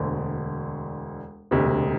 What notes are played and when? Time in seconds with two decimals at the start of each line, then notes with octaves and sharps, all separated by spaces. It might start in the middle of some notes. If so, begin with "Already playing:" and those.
Already playing: E1 D2 D3
1.51 E1 D2 C3